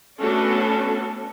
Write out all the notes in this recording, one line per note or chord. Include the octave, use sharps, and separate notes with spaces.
A3 B3 C#4 D4 F#4 A4